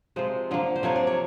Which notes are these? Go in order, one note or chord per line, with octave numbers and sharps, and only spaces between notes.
C3 F3 G#3 C5
D3 F3 A#3
C5
C3 F3 A#3 C#5
D5
C#5